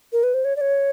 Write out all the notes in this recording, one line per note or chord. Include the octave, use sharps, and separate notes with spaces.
A#4
B4
C5
C#5
D5
C#5